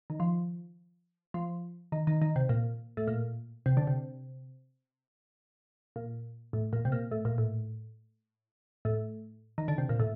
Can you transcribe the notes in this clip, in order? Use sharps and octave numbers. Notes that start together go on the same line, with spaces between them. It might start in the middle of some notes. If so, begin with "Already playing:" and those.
D#3
F3
F3
D#3
D#3
D#3
C3
A#2
A2
A#2
C3
D3
C3
A#2
A2
A#2
C3
A#2
A2
A#2
A2
A2
D#3
D3
C3
A#2
A2